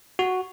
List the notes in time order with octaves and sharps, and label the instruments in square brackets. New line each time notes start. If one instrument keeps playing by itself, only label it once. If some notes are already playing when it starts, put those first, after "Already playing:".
[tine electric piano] F#4